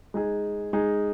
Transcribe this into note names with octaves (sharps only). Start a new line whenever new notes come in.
G#3 D#4 G#4
G#3 D#4 G#4